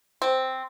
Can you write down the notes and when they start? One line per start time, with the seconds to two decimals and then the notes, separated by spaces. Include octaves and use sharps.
0.22 C4